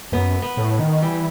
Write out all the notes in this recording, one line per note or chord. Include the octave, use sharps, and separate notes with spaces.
F#2 B3
B3
A2
D#3
E3 G3